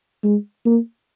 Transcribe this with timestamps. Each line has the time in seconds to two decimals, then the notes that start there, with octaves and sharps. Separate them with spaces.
0.24 G#3
0.65 A#3